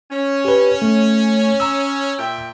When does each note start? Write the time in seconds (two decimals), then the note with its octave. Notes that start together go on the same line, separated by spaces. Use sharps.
0.11 C#4
0.45 G4 B4
0.82 A3
1.60 A#5 E6
2.19 A#2 E5 G5